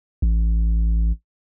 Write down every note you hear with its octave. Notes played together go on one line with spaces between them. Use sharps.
A1